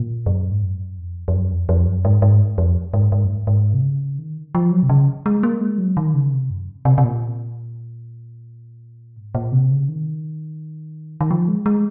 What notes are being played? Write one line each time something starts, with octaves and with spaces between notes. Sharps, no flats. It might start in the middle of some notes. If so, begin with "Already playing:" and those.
Already playing: A#2
F#2
G#2
F#2
F2
F2
F#2
F2
F2
F#2
G#2
G#2
F2
G#2
G#2
F#2
G#2
G#2
C3
C#3
D#3
F3
F#3
C3
C#3
G#3
A#3
G#3
F#3
D#3
C#3
C3
F#2
C3
C3
A#2
G#2
A#2
C3
C#3
D#3
D#3
F3
G#3
G#3